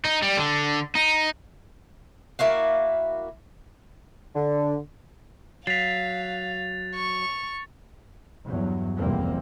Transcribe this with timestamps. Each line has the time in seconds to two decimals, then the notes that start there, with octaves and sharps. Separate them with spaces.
0.05 D#4
0.22 G3
0.37 D3
0.95 D#4
2.39 A#3 E4 F#4 F5
4.35 D3
5.67 F#3 F5 A6 B6 C7 F7
6.95 C#6
8.46 E2 G2 F#3
8.97 F1 B1 E2 G3 A#3 C4